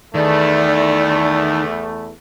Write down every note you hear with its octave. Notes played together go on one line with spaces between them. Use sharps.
E2 D#3 A3 D5